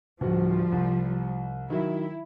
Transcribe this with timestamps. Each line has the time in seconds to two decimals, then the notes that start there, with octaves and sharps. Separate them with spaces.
0.21 D1 F3 G3 F#4
0.72 C2
1.70 D#3 F#3 E4